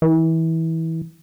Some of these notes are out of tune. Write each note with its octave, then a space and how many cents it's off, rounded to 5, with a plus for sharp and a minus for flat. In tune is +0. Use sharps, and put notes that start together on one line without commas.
E3 -25